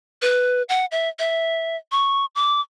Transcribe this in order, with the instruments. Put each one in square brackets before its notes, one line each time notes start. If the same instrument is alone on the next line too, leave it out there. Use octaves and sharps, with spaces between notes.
[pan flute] B4
F#5
E5
E5
C#6
D6